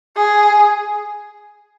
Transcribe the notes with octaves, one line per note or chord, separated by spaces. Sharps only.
G#4